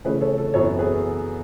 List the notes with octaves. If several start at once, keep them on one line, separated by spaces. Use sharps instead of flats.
C#3 E3 A3 C#4 G#4 B4
A4 C#5
A4
F#2 E3 B3 A4 C#5
G#4 B4